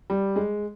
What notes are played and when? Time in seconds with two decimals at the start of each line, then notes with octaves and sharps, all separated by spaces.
0.10 G3
0.36 G#3